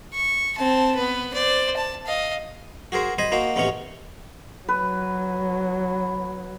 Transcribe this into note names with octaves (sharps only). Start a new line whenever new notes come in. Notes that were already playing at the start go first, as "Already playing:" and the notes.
C#6
C4 A5
B3 B4
C5 D5
A5
D#5 F5
F#4 G#4 A#4 C5
C5 D#5 G#5 B5
A#3 D#4 F#4 C5
A1 C3 B3 C#4 D#4 C#6
F#3 B4